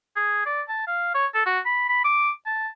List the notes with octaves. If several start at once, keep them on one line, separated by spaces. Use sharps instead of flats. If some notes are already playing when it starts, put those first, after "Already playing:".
G#4
D5
A5
F5
C#5
A4
F#4
B5
B5
D6
A5